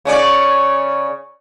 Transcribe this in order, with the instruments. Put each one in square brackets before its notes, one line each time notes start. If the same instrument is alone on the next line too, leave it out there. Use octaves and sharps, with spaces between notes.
[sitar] C#3 C#4 D5